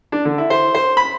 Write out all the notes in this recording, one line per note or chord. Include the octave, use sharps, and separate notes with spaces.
D4
D3
E4
C5
C5
B5